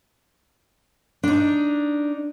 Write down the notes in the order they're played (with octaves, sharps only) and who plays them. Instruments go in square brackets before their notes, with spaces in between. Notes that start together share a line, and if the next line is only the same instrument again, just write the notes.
[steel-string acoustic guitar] D4 D#4